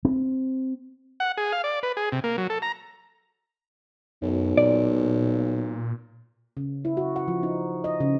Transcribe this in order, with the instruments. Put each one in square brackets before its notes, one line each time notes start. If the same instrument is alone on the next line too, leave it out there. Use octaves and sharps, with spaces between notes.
[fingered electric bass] C4
[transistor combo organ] F#5
G#4
F5
D5
B4
G#4
C3
A#3
F#3
A4
A#5
[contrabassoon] B1 [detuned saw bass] F#2
[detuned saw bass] A#2 [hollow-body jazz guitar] D5
[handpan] C#3
E4
F#4
F#5
F3
D#4
D#5
C#3